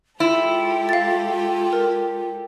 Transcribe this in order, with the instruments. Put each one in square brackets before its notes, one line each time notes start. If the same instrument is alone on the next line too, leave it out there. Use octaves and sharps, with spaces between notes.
[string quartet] G#3 G4 A4 [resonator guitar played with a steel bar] E4 [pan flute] F4
[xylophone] F5 A6
A#4